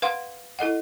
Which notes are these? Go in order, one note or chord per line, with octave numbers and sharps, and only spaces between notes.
B4 F5 F#5 C6
E4 A4 D#5 F#5